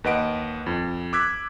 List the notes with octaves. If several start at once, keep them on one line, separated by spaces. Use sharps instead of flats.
D#2 B4 D#5 F#5 D7
F2
D6 E6 F#6 G#6 B6